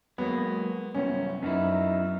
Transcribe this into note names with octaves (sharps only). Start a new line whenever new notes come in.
F#3 G#3 A#3 B3
C2 F#2 B3 C#4
F#2 B3 D#4 E4